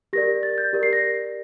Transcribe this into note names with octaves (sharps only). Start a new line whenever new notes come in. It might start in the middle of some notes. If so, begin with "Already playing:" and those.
G4 A#4 D5 A#6
A6
G6
G4 A#4 D5
C7
A#6